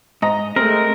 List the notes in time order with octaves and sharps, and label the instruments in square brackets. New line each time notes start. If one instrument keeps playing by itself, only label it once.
[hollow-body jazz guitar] G#2 [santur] D#5 A#5
[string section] G#3 A3 [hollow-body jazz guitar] C4 [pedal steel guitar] A#4